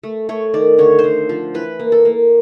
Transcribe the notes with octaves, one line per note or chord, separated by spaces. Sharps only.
A3
A3 C#5
D#3 D5
D3 C#5
C5
D3
F3
E3 B4
A#3
A4
A#3